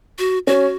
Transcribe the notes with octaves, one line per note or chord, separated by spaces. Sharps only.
F#4
C#4 F#4